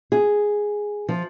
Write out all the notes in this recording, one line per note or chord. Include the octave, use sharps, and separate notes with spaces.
G#4
F3